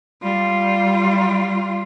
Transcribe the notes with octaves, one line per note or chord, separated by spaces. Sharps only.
G3 F4